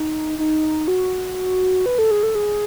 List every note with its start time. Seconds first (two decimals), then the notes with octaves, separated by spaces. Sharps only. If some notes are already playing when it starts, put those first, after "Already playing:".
Already playing: D#4
0.39 D#4
0.88 F#4
1.86 B4
1.98 A4
2.11 G#4
2.23 A4
2.35 G#4